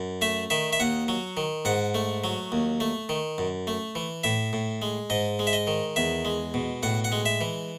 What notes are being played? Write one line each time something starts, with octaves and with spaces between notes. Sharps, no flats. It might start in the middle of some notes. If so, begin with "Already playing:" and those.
Already playing: F#2
A3 E5
D#3 E5
E5
D#2 F#5
F#3
D#3
G#2 F#5
A3
F#3
D#2
A3
D#3
F#2
A3
E3
A2 E5
A2
G#3
G#2 D#5
G#3
E5
D#5
D#3
E2 E5
G#3
B2
A2 F#5
F#5
G#3
E5
E3